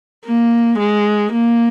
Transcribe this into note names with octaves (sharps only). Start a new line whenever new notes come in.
A#3
G#3
A#3